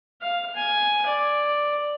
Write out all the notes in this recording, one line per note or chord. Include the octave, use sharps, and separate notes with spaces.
F5
G#5
D5